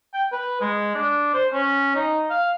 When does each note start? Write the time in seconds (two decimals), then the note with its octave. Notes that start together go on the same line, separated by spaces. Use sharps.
0.13 G5
0.32 B4
0.61 G#3
0.95 D4
1.34 C5
1.53 C#4
1.95 D#4
2.30 F5